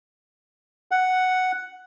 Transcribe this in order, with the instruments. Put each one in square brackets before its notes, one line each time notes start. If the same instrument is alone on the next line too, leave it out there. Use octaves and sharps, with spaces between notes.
[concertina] F#5